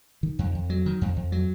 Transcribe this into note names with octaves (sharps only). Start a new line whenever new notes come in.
D#3
F2
F2
F#3
D#3
F2
F2
F#3